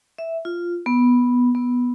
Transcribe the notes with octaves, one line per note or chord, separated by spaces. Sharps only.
E5
F4
B3
B3